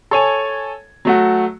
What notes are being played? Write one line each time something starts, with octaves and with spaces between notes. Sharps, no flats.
A4 C#5 G#5
F#3 A3 F#4